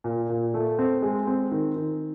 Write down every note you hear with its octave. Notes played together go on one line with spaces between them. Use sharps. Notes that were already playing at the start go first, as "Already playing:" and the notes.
A#2
A#2
A3
C4
G#3
C4
D#3
D#3